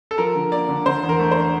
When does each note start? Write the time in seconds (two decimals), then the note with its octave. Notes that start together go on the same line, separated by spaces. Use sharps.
0.11 A4
0.18 F3 A#4
0.35 D3
0.52 A#3 D5
0.69 D3
0.86 D3 C5
1.03 E2
1.09 A#4
1.20 A3
1.31 C5
1.37 D4